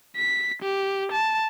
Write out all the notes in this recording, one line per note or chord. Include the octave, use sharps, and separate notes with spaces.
B6
G4
A5